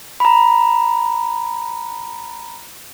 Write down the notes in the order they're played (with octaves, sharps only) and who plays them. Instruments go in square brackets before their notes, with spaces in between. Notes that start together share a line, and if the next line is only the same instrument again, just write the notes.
[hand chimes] A#5 B5